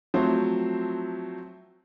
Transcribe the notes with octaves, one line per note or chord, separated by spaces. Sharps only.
F3 F#3 A3 C4 C5